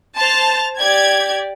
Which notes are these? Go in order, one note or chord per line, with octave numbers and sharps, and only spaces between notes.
C5 A5 A6 F7
G4 D5 G#6